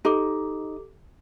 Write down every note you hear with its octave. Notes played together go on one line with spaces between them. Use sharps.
D#4 G4 A4 D6